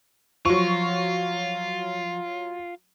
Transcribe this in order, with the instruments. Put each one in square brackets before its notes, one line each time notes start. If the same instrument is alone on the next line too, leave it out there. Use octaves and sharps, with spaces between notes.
[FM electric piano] F3 [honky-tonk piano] F#3 C#6 [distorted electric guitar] F4